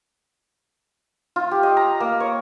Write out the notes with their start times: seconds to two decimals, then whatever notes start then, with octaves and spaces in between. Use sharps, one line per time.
1.36 F4
1.51 G4
1.63 D#5
1.77 A#5
2.00 A#3
2.20 C#5